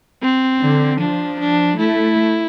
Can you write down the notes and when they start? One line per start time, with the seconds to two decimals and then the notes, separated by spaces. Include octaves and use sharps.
0.22 C4
0.62 D3
1.00 F3 D4
1.40 D4
1.80 A3 E4